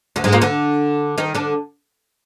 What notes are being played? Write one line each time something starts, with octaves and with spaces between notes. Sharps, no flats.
D2 D3
G#2 G#3
A#2 A#3
D3 D4
D#3 D#4
D3 D4